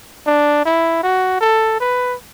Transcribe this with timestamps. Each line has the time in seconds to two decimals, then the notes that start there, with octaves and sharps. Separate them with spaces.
0.26 D4
0.65 E4
1.03 F#4
1.41 A4
1.80 B4